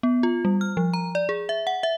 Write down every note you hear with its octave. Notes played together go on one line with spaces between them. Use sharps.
B3
F4
G3
F6
F3
A#5
D5
G#4
E5
F#5
E5